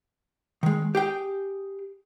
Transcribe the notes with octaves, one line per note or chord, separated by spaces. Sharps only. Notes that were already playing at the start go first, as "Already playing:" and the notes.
D#3 G#3
G4 G#4 G5